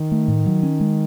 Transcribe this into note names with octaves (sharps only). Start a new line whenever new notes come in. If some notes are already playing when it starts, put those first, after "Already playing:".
Already playing: D#3
A3
A2
F#3
C#4
G#3